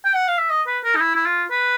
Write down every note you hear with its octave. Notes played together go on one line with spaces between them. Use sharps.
G5
F#5
F5
E5
D#5
B4
A#4
D#4
E4
E4
F4
B4